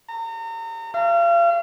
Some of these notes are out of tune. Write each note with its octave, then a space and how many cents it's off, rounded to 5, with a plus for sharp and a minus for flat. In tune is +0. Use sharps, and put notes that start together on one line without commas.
A#5 -35
F5 -35